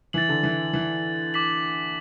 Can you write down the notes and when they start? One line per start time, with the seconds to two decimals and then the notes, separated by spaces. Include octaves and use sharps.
0.13 E3 A6 F#7
0.29 D3
0.43 E3
0.73 E3
1.34 D6 B6 F#7